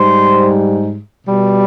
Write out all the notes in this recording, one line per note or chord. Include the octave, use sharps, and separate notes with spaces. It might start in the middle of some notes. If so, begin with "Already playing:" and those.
Already playing: G#2 G3 C5
B2 G3